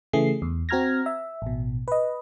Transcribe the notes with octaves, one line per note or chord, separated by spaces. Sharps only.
C#3 E3 A3 G#4 C7
E2
C4 F#4 A#5 F6 G#6 A#6
E5
A1 B2
B4 D#5